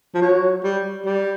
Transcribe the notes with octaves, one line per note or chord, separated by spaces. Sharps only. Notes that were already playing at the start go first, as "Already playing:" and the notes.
F3
F#3
G3
G3